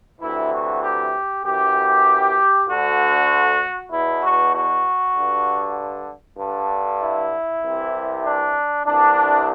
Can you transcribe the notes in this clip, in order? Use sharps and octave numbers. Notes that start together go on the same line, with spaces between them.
D2 C3 E3 E4
F#4
G4
F#2 E3 G4
D2 D3 F#4
E2 B2 E4
F#4
F#4
G2 D3
G2 D3
E4
C2 C3 E3
D4
C2 C3 E3 D4